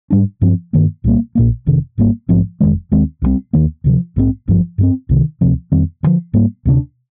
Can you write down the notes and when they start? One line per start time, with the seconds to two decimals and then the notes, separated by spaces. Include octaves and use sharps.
0.10 G#2 G3 D4
0.41 G2 F3 C4
0.73 G2 D#3 A#3
1.04 C2 A#2 G3 A#3
1.35 A#1 A#2 G3 A#3
1.66 F1 F2 C3 D#3
1.98 G#1 G#2 G3 A#3
2.28 A#1 G#2 F3 C4
2.60 F1 D#2 D#3 G#3
2.92 D#2 D#3 G#3 C4
3.22 C2 C3 G3 C4
3.53 D#2 D#3 A#3
3.84 D2 C3 F3
4.16 A#1 G#2 F3 C4
4.48 G#1 G2 D3 F3
4.78 G2 F3 C4
5.09 C2 C3 D#3
5.41 D2 C3 F3 C4
5.72 F2 D#3 G3 C4
6.03 D2 D3 F3
6.34 G#2 G3 A#3
6.65 D2 C3 G3 D4